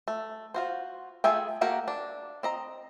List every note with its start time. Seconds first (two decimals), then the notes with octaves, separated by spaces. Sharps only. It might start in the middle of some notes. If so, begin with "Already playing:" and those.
0.08 A3
0.54 F4 F#4 C5
1.24 A3 F4 G#4 E5 G5
1.61 A3 A#3 F#4 G4 A#4
1.88 D4
2.43 C4 D#5 A#5